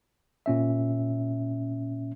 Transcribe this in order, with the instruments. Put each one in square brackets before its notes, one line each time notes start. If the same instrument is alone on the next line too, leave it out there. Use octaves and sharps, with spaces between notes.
[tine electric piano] A#2 C#4 E5